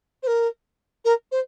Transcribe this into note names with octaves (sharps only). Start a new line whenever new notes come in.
C5
A#4
A#4
C5